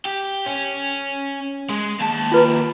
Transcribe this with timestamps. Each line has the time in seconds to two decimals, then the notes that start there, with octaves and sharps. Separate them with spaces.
0.05 G4
0.46 C#4
1.70 G#3
2.00 D#2 A5
2.32 F4 B4 A#5